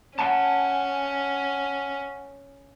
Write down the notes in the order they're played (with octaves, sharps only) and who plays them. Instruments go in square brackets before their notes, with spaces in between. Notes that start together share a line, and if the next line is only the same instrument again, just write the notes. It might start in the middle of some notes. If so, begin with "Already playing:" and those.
[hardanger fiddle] C#4 [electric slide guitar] F#5 G#5 A5